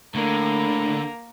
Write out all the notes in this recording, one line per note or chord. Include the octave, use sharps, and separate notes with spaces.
A2 D3 A#3 D4